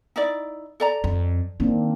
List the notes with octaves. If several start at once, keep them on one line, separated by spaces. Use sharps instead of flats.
D#4 E4 D5
A4 D5 A#5
F2
D#3 A#3 C4 D4